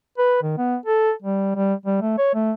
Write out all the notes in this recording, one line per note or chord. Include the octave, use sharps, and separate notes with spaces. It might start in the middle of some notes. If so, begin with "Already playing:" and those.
B4
D#3
B3
A4
G3
G3
G3
A3
C#5
A3